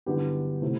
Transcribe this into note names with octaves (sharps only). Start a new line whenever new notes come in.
G2 D3 F#3 B3 E4 G4
C3 F#3 A3 C4 E4